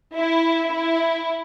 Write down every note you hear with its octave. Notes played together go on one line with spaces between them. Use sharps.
E4
E4